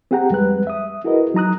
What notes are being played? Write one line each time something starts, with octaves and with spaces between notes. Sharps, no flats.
C4 G4 G#4 F#5 G5 A#5
F2 G3 G#3 B4 F#6
E5 D#6
E4 F#4 G#4 A#4 B4 D#5
F#3 D#4 A#5 D#6 F#6